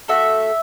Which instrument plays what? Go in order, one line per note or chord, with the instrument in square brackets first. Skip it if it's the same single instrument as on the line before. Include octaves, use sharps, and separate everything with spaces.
[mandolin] A3 D4 F#4 A4 E5